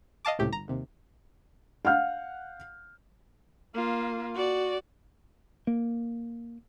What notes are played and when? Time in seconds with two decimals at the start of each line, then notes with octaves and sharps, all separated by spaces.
0.25 D#5 F5 A5 D6
0.39 C#2 A2 C3 G4
0.50 G1 A#5
0.68 D#2 C3
1.85 F5 F#5 F6 G6
3.74 A#3 F4
4.35 F#4 D5
5.67 A#3